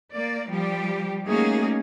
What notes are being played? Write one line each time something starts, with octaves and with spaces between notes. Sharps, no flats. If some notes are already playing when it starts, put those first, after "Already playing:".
A#3 D5
F3 G3 G4
A3 A#3 C#4 D#4 F#4 G#4